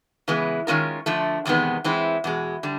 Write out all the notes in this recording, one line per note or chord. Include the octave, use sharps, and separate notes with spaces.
C#3 E3 G#3 B3
D#3 G#3 C#4 F4 A#4
D3 F3 A3
E2 C3 D#3 G#3 B3
E3 G#3 C4 E4
E2 B2 G#3
D3 G3